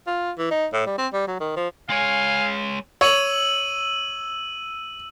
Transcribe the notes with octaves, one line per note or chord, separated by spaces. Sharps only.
F4
E3
D#4
A2
G3
C4
G3
F#3
D#3
F3
G#3 C#5 F5 G#5
C#5 E6 D#7 F#7